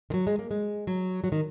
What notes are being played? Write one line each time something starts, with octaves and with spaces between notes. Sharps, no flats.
D#3
F#3
G#3
A#3
G#3
F#3
F#3
D#3